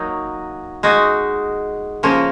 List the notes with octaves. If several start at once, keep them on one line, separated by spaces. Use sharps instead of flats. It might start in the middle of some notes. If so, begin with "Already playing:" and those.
Already playing: F#3 A#3 D#4
G#3 D#4 F#4
C#3 F3 A#3 C#4